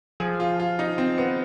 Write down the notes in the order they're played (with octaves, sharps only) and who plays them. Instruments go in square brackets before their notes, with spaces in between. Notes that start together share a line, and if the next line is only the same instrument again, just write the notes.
[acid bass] F3 [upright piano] G#4
[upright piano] F4
F4
D#4
C4
B3